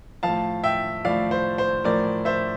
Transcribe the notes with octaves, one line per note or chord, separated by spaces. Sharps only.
A2 F3 F5 A5
E5 G5
A2 F3 D5 F5
C5
C5
A2 F3 A#4 D5
C5 E5